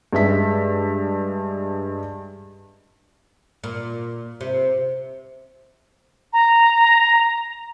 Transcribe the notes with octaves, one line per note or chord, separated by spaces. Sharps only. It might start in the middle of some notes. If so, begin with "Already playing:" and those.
G2 G#3 E5 B6
A#2
C3
A#5